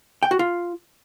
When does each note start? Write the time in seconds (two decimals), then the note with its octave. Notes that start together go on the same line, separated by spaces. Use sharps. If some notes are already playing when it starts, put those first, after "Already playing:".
0.23 G5
0.31 F#4
0.39 F4